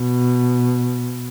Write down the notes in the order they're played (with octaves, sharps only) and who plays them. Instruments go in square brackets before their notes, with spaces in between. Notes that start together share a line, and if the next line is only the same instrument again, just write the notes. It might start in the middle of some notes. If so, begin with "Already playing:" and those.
Already playing: [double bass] B2